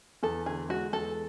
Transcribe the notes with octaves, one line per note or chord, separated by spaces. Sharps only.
E2 A4
D3 G#4
G#3 F#4
E2 A4